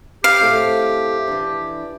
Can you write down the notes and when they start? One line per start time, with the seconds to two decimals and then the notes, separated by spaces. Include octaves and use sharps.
0.24 G4 F5
0.41 A2 A3 C4
1.28 E3 D4